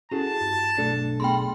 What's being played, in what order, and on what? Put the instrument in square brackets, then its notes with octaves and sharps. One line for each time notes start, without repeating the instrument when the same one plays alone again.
[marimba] C#4 E4 A4 [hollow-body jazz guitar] F#4 G#4 [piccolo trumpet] A5
[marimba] G2
[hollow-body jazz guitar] B1 D4 A4 [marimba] A3
[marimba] A3 B3 G#4 [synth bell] G5 B5 C6